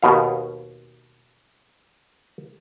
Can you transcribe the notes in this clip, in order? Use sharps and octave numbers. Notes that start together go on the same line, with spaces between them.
D#2 B2 F5